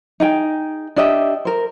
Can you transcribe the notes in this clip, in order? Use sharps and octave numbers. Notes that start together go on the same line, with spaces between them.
D#4 G#4 G5
D4 G4 D#5 E5
A#4 C5